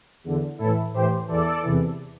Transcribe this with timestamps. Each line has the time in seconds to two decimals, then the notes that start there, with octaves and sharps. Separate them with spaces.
0.24 E2 D3
0.58 A2 E3 E4 A4
0.93 A2 E3 G4 C5
1.28 E2 E3 A4 D5
1.62 E2 C3 E3